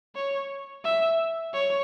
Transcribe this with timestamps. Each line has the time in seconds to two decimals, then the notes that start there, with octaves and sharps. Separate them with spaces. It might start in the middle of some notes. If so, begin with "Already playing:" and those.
0.15 C#5
0.84 E5
1.53 C#5